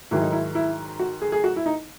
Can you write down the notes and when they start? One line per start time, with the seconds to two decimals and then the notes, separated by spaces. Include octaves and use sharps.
0.11 G#2 D#3 F#3 E4
0.21 D#4
0.32 E4
0.55 E4
0.99 F#4
1.22 G#4
1.32 G#4
1.44 F#4
1.56 E4
1.66 D#4